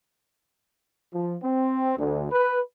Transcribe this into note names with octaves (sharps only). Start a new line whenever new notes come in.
F3
C4
D2
B4